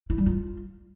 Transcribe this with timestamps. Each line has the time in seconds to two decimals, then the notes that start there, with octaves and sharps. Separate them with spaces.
0.10 E4
0.18 G3
0.26 F4